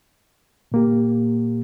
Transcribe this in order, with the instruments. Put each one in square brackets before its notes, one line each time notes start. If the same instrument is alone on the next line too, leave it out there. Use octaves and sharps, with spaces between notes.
[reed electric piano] A#2 A#3 G4